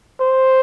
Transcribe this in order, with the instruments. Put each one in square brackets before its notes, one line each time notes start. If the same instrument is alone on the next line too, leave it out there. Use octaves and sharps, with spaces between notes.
[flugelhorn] C5